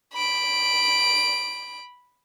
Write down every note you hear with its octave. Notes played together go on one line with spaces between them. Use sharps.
B5 D7